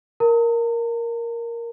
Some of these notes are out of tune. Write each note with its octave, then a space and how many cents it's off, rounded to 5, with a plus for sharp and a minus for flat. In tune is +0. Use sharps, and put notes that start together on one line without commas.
A#4 +0 A#5 -45